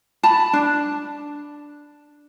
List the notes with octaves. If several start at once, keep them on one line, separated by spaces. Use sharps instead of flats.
A5 B5
D4